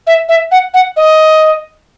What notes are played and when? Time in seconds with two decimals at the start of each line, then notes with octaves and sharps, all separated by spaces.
0.06 E5
0.28 E5
0.51 F#5
0.73 F#5
0.96 D#5